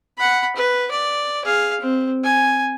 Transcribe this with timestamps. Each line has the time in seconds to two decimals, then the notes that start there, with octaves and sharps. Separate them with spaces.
0.18 F#5 B5
0.56 B4
0.91 D5
1.45 G#4 F5
1.80 C4
2.23 G#5